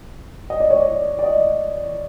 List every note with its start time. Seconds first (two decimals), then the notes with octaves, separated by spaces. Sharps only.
0.50 D#5
0.60 D5
0.70 C#5
0.80 D5
1.19 D5
1.24 D#5